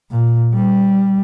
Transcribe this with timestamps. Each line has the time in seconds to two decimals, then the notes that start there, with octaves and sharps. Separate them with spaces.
0.11 A#2
0.55 G3